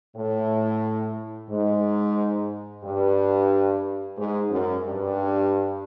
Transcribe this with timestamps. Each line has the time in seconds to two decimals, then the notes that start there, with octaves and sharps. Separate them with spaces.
0.16 A2
1.49 G#2
2.84 G2
4.17 G#2
4.51 F#2
4.85 G2